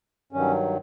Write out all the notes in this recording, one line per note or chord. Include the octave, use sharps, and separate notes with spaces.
G2 D#3 F#3 C#4